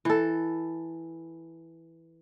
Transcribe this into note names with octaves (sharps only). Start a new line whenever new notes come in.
E3 A4